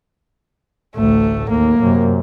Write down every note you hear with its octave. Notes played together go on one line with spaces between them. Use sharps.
A1 D2 A3
D#2 A#3
F#2 C3